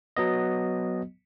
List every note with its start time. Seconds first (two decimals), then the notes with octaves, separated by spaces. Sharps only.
0.17 F#3 B3 D#5